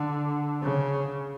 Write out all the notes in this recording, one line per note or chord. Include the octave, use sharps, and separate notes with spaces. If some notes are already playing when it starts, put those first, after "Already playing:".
Already playing: D3
C#3